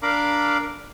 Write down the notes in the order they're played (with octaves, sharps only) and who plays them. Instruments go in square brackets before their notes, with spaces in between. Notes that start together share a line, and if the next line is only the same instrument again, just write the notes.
[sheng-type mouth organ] D4 A#4 F5 A#5 B5 D6